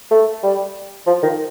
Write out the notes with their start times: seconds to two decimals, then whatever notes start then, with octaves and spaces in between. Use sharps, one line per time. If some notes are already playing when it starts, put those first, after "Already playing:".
0.11 A3
0.43 G3
1.07 F3
1.23 D#3